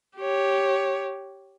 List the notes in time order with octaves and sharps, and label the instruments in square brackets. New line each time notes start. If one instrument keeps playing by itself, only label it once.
[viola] G4 C#5